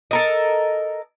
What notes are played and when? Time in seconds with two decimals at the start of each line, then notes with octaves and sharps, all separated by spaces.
0.11 A4 A#4 D#5